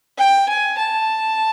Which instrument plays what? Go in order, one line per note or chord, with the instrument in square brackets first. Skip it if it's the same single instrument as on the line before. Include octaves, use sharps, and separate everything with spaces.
[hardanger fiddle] G5
G#5
A5